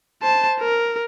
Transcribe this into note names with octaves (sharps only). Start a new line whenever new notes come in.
C5 A5
A#4